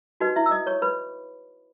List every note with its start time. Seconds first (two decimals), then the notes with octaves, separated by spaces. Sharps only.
0.20 D#4 F#4 B4 D#5
0.36 E4 E5
0.46 E6
0.51 D#5 D#6
0.67 C#5 C#6
0.82 B4 B5